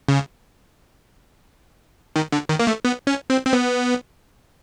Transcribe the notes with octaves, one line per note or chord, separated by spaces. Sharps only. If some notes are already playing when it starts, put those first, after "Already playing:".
C#3
D#3
D3
D#3
A#3
A3
B3
C#4
C4
C4
B3